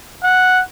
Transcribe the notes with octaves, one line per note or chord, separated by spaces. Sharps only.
F#5